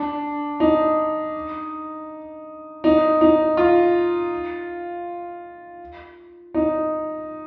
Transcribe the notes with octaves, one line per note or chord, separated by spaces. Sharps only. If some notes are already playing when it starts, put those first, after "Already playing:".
Already playing: D4
D#4
D#4
D#4
F4
D#4